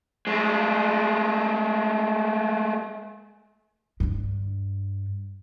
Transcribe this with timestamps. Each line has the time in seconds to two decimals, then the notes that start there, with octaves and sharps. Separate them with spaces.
0.27 G#3 A3
4.00 G2 D4